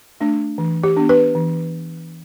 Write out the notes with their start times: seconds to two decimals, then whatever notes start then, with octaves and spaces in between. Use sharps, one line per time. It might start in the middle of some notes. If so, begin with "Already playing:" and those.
0.21 A3 D4
0.58 E3
0.83 G4
0.97 B3 D4
1.09 B4
1.35 E3